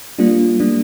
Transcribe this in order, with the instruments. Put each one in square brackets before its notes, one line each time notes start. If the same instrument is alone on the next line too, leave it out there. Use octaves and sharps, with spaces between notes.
[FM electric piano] G3 A#3 D4 F4
G3 A#3 D4